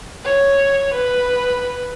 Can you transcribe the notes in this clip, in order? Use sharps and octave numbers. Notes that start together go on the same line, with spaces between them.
C#5
B4